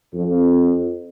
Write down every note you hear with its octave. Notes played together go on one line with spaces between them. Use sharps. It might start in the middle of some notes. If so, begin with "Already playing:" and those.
F2